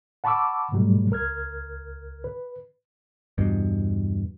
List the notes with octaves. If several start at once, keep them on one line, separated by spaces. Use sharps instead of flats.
F#5 A5 B5 C#6 D6 E6
G#2 B2 F#3 G3 A3
C#2 A#4 F6 G#6
B4
E2 G2 B2